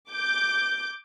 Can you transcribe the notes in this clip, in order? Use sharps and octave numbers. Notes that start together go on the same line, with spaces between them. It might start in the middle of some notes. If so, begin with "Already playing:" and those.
D6 G6